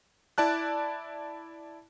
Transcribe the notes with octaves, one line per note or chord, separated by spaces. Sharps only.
E4 D5 A5 F#6